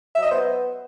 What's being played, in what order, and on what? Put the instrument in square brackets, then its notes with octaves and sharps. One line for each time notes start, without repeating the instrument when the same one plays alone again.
[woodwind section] F#3 E5
D#5
B3 C5